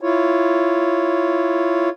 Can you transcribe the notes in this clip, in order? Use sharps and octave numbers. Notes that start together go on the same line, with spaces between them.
E4 F4 C#5